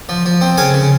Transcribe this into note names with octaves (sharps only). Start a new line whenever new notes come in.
F3
F3
C4
C#3 F5 G#5
C#3